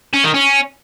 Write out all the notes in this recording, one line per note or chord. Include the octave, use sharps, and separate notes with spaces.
C#4
D#3
C#4